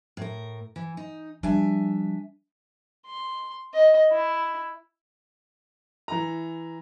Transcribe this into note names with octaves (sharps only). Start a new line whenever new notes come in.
A2 A#4
E3
D#4
F3 G3 D4 E5 G#5
C6
D#5
E4
E3 A#5